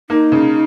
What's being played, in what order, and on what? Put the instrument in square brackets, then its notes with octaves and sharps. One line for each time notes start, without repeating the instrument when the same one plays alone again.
[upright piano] A#3 [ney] D#4
[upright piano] C#3